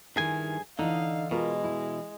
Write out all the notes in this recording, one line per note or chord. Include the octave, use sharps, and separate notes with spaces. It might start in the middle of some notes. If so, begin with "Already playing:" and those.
G2 D#3 E4 G#4 G#5
D3 E3 D#4 D#5 F5
B2 G#3 F4 A#4
E4